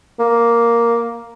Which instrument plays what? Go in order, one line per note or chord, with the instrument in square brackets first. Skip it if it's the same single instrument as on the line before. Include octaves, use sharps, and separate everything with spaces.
[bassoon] A#3